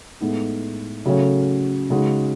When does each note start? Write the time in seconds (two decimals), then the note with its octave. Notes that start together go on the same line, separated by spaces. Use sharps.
0.21 A2 G#3 B3 D#4
1.05 C#3 F#3 A3 C#4
1.90 C#3 G#3 D#4 F#4